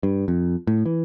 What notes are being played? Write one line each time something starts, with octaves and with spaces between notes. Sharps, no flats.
G2
F2
A2
E3